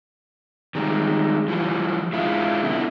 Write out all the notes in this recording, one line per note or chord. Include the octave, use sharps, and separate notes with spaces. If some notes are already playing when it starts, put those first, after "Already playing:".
D#3 G3 G#3
E3 F3 G3
G#3 E4 F4
B2 D3 E4